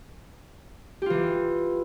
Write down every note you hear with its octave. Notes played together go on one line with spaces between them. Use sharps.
E3 F4 G4